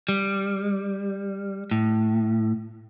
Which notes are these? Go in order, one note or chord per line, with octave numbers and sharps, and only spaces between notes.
G3
A2